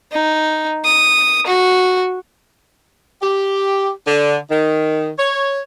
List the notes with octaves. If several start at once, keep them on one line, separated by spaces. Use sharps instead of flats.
D#4
D#6
F#4
G4
D3
D#3
C#5